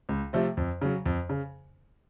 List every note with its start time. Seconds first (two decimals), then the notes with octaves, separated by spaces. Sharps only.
0.09 C#2
0.33 C3 F3 A3 C4
0.57 F2
0.82 C#3 F#3
1.06 F2
1.29 C#3